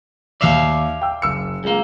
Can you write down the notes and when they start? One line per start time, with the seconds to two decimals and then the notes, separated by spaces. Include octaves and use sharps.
0.41 D#2 D5 E5 F5 F7
1.02 G5 E6
1.22 F#1 E6 C#7
1.64 C#2 G#3 A#3